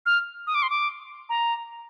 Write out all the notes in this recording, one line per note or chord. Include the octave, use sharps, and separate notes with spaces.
F6
D#6
D6
C6
D6
A#5